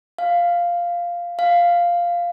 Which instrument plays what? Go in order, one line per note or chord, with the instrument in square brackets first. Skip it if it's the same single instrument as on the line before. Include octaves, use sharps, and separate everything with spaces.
[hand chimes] F5
F5